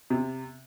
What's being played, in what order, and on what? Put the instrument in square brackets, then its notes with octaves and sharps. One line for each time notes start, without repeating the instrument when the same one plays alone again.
[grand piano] C3